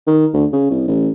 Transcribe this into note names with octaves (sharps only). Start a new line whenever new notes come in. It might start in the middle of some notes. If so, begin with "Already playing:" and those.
D#3
D2
C#3
C2
A1